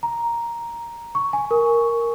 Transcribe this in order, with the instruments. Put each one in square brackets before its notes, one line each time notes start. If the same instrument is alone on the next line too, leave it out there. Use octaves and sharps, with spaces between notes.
[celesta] A#5
C#6
G#5
A#4